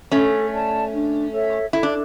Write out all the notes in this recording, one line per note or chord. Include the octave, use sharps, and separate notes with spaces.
A3 C#4 A4
D5 A5
D4
A4 C#5 E5
E4 A4
D4